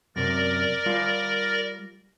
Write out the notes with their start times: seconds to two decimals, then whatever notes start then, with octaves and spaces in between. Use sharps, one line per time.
0.16 F#2 C3 A#4 D5 A#6
0.86 G3 F4 F5